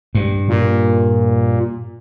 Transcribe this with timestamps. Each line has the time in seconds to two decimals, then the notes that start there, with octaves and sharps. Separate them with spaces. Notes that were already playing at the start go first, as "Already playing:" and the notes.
0.15 G2
0.48 A#2